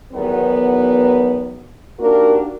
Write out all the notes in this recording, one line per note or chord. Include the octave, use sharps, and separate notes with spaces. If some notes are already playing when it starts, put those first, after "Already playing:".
E2 D#3 F#3 B3
A#3 D4 D#4 F#4 G4 A#4